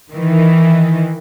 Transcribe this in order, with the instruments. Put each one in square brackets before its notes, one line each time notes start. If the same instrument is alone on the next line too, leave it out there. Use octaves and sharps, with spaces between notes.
[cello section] D#3 E3